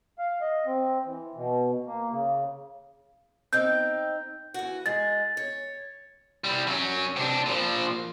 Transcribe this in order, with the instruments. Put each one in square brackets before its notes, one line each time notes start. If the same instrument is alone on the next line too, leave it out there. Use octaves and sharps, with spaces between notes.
[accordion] F5
D#5
C4
E3
B2
A#3
C#3
[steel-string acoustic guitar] C4 D#4 G5 [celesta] G6
[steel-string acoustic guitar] E3 F#4
[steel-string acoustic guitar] G#3 [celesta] A6
[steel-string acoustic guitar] C#5
[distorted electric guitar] G3 E4
F#3 C#4
C3 D4
A#2 F3